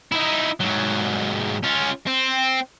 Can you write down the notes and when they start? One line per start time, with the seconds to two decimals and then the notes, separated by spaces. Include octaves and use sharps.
0.12 D#4 E4
0.61 G#2 F#3
1.63 C#4 F4
2.07 C4